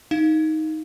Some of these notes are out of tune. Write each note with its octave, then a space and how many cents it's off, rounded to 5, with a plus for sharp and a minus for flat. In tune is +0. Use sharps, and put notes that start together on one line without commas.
D#4 +10 F5 +0